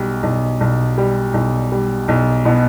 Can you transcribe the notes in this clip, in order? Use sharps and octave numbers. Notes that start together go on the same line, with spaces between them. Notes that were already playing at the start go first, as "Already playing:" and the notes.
Already playing: B1 G3
B1
B1
G3
B1
G3
B1
B2